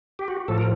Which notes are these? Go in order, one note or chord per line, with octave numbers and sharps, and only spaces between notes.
G4
F#4
A2 F3 A4
A#4